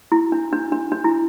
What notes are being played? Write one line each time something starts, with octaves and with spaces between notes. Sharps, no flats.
E4
D4
D4
D4
D4
E4